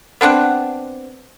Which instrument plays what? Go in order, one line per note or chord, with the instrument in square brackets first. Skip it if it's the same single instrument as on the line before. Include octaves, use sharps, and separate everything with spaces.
[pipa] B3 C4 D4 F#5